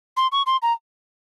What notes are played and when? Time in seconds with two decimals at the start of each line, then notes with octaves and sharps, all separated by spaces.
0.17 C6
0.32 C#6
0.46 C6
0.62 A#5